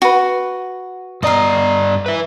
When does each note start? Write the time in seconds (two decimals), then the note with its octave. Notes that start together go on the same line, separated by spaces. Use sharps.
0.02 F#4 B4
1.23 G2 D5 D#5 F5 A#5
2.06 B4 E5